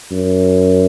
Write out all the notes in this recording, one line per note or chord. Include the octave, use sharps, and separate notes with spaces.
F#2